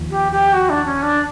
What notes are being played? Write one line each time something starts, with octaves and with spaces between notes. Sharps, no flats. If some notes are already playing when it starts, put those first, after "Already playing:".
Already playing: D#2 F3
G4
G4
F#4
D4
C#4
D4